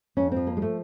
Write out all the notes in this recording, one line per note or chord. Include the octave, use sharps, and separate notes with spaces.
F2 C#4
F3 C4
A#3
G#3
A3